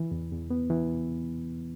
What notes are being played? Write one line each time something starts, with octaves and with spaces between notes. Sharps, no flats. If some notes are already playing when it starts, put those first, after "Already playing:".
Already playing: E3
E2
E2
B3
E3